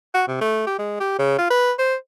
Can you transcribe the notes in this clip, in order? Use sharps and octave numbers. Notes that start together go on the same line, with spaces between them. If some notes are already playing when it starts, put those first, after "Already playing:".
F#4
C3
A3
G4
G#3
G4
C#3
F4
B4
C5